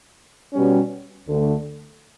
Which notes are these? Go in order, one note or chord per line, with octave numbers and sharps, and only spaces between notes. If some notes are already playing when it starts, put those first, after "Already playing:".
B2 G3 C#4
D2 D3 A3